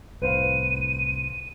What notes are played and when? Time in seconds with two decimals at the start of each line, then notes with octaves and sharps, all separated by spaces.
0.22 C2 A2 B4 C5 F5 D#7